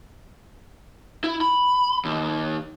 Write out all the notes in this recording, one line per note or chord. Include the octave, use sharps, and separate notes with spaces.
E4
B5
D#2